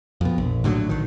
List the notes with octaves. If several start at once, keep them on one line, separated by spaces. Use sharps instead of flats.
F2 B2
A#1
A2 D3 E3 F#3
A#1 D#3